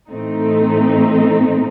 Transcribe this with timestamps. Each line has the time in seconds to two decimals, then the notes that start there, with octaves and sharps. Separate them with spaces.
0.10 A2 E3 A3 C4 D#4